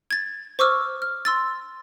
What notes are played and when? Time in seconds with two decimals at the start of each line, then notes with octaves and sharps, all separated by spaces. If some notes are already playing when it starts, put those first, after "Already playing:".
0.11 G#6 A6
0.59 C5 C#6 D6 E6 F6
1.02 F6
1.25 C6 E6 A6